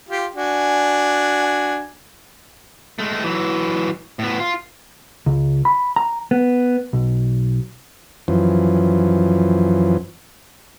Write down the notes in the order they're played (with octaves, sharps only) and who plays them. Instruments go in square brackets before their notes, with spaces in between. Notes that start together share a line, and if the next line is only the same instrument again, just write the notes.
[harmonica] F4 G4
D4 F#4 G#5
[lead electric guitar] G#3 A3
E3 F#3
A2 B3
F4
[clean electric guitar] C#2
B5
A#5
B3
B1
[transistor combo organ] F#2 E3 F3